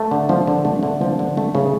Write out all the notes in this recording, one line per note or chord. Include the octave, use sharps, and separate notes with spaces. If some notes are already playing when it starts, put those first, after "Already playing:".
Already playing: A3
D3
F3
D3
A3
D3
F3
D3
A3
C#3